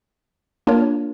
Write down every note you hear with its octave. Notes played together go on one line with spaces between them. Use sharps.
A#3 D4 F4 A#4 C#5